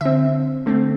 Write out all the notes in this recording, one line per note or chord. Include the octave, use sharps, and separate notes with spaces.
D3 C4 E5
D3 A3 C4